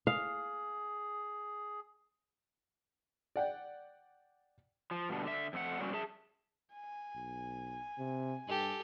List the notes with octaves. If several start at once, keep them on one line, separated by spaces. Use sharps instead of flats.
G#4 F5
D5 F#5 G5
F3
G2 B2 D3
D3 E5
F2 A3 F#5
F#3 G3 A#3 C4 C#4 F#4
G#4 E5 A5
G#5
B1
C3
G2 G4 A4